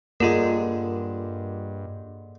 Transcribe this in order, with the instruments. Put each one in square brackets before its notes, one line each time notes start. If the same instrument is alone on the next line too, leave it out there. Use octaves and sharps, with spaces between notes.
[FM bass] G2 [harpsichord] D3 G#3 [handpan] A#3 [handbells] F4 A#4